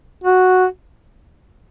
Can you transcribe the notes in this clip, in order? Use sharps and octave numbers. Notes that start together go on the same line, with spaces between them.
F#4